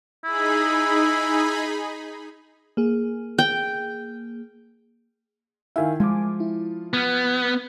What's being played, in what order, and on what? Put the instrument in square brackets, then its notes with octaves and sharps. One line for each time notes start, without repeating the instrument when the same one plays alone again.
[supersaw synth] D#4 G#4 B5 [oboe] E4
[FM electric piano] A#3 G#4
[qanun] G5
[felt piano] D#3 E4 [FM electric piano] E5 F5 G#5
[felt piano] F3 F4 [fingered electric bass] G#3 [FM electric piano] G#5 D6
[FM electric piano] E4
[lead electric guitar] B3 [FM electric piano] F6 G#6